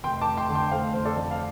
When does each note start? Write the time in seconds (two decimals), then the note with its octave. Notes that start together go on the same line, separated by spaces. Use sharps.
0.04 F1 G5 C6
0.22 A5 D6
0.26 F1
0.37 G5 C6
0.49 D3
0.55 G5 C6
0.66 G5
0.71 A3 C5 F5
0.94 F2 C5
1.05 A4 D5
1.17 F2
1.31 F5